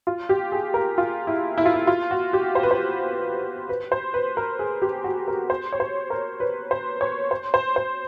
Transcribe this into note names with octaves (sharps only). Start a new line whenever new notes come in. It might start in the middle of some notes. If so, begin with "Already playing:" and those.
F4
G4
G#4
A#4
F4
E4
E4
F4
E4
F4
F#4
G4
C5
B4
C5
B4
C5
B4
A#4
G#4
G4
F#4
A#4
C5
C#5
C5
A#4
B4
C5
C#5
C5
C5
C5